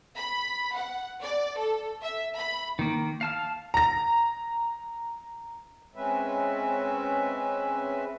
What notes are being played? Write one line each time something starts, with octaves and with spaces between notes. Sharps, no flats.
B5
F#5
D5
A4
E5
B5
D#3 A#3
F5 A5 F6
A#5 A#6
G#3 C4 C#4 B4 E5